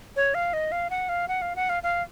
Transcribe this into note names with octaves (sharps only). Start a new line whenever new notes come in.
C#5
F5
D#5
F5
F#5
F5
F#5
F5
F#5
F5
F5